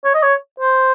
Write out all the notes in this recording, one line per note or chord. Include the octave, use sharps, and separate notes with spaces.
C#5
D#5
C#5
C5